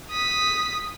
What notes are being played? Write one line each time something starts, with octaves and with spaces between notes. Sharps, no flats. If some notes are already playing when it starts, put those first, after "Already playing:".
D#6 B6